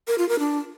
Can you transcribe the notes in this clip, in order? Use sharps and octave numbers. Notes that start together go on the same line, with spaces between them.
A#4
F4
A#4
D4